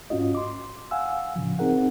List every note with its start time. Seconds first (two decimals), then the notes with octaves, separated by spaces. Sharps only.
0.10 G#2 C#4 F4 F#4 D#5
0.35 C6 D6
0.91 F5 F#5 G#5 E6
1.36 A2 C#3 F3
1.59 C4 D#4 G#4 A#4 F#5